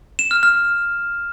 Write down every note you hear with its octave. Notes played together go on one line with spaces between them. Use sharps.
E7
F6
F6